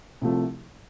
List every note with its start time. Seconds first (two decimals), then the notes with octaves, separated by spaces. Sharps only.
0.21 C2 C3 F3 A3